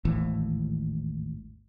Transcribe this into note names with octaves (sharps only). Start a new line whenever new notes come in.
G#1 D#2 A2 E3